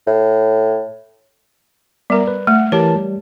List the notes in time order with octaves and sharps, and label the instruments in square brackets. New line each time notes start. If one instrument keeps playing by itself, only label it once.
[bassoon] A2
[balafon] G3 A#4 [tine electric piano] B3 E5 A#5
[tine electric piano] B4
[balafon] A3 [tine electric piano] F#5
[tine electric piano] E3 A#4 A5 [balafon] G4 C#5
[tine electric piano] G3